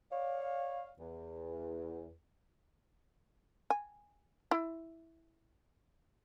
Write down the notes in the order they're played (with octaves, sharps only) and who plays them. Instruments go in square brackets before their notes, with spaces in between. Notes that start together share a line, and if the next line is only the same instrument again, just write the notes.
[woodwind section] C#5 D5 F5
E2
[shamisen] G#5
E4